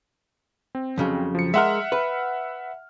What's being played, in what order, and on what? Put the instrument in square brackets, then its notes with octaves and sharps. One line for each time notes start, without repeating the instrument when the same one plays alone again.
[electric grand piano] C4
[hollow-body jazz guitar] F2 C#3 F#3
[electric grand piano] F3 C#7
[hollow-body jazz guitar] G#3 A#4 [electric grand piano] E5 F#5 F6
[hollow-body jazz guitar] B4